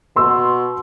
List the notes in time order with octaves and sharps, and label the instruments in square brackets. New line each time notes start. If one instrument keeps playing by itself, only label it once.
[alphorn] B2 [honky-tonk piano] C6 E6